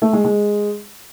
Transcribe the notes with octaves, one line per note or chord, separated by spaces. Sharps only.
A3
G#3
G#3